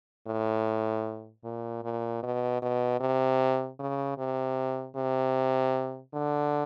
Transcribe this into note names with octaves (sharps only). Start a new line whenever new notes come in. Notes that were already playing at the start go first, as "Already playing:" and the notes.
A2
A#2
A#2
B2
B2
C3
C#3
C3
C3
D3